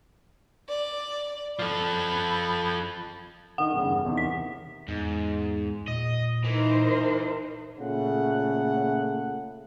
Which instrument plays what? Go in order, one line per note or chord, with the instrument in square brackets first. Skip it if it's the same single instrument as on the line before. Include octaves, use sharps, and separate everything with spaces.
[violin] D5
[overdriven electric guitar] F3 A4 [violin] B5
[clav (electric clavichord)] D3 D#3 [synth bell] F#5
[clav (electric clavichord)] E2 G2 C#3
E2 C3 D#3
[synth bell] B6
[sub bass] E2 [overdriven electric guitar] G#2
[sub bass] A#2 [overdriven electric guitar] D#5
[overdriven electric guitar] E3 [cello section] D#4 A#4 C5
[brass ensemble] A#2 C#3 A3 F#5